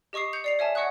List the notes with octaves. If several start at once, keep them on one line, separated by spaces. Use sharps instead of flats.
G4 D#5 C#6 D#6 C7
G6 C#7 F7
D5 C7 F7
C#5 E5 G#5 A5
C#5 D#5 F#5 C#6 D#6 F#6